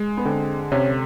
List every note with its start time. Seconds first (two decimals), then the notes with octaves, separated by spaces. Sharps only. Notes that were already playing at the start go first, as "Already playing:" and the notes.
Already playing: G#3
0.17 B3
0.25 D3 C4
0.72 C3 C#4